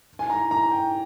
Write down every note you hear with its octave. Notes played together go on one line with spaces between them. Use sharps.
G#5
A#5
A#5
G5